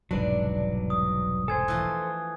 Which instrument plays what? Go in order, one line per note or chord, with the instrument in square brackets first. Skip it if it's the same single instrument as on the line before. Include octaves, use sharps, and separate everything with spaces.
[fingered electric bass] E1 C2 G#2 [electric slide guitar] F#3 B4 D5 [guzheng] D4
[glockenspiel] D#6
[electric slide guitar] A4 C5 [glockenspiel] G#5 G#6
[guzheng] E3 F3 A3